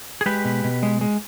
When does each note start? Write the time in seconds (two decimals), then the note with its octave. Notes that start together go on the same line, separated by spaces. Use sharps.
0.21 G#4
0.26 G#3 G4 B4
0.45 B2
0.64 B2
0.83 G#3
1.01 G#3